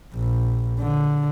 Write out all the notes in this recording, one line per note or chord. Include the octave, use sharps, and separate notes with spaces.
A#1
D3